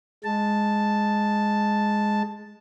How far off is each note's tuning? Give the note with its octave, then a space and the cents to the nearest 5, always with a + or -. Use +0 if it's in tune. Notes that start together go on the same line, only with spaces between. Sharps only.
G#3 +0 A5 +0